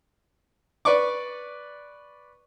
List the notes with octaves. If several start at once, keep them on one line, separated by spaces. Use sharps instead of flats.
B4 D5 C#6 D6